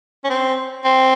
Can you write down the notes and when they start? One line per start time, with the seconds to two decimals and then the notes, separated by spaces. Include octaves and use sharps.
0.24 C#4
0.30 C4
0.85 C4